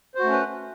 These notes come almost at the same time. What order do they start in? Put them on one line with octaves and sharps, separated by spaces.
C5 F#4 A3 C#4 B4